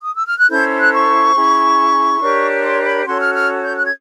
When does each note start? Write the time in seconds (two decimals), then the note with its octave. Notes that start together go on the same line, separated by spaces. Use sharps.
0.02 D#6
0.14 E6
0.26 F6
0.38 F#6
0.50 C#4 E4 A4 C5 G6
0.78 F#6
0.93 C#6
1.35 C#4 E4 G#4
2.21 D4 G4 A#4 C#5
2.63 C6
2.85 B5
3.05 C#4 F#4 A4 C#5 C6
3.20 F6
3.34 F6
3.62 G6
3.77 F#6
3.85 G#6